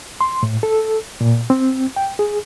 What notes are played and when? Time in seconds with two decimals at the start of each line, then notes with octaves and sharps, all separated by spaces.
0.21 C6
0.43 A2
0.63 A4
1.21 A#2
1.50 C4
1.96 G5
2.19 G#4